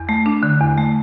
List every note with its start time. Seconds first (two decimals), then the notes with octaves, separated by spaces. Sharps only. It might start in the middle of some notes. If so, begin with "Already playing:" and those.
Already playing: E2
0.09 A3
0.26 D4
0.43 D3
0.61 E2
0.77 A3